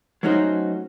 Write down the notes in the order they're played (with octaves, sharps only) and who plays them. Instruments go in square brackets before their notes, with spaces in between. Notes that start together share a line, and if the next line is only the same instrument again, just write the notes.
[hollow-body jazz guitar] F#3 A3 C#4 D#4 F#4 C5